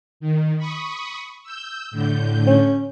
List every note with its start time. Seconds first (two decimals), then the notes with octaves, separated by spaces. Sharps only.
0.20 D#3
0.58 B5 C#6 D#6
1.43 E6 G6
1.91 A2 D3 G6
2.47 C#4